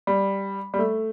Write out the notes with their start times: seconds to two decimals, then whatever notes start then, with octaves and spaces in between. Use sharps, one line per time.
0.07 G3
0.74 G3
0.79 A3